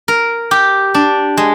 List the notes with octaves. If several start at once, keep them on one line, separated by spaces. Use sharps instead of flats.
A#4
G4
D4
G#3